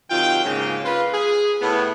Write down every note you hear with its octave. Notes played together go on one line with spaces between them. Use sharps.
C3 D#3 F#3 F4 G5
G#2 C#3 A#3
F4 B4
G#4
A2 B3